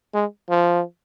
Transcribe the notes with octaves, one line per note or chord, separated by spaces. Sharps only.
G#3
F3